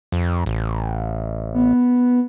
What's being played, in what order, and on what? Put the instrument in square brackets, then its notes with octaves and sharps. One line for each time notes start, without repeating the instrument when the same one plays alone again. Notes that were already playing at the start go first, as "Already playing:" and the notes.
[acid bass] F2
A1
[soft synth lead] B3